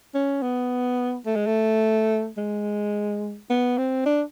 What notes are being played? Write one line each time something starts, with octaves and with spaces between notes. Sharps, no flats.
C#4
B3
A3
G#3
A3
G#3
B3
C4
D4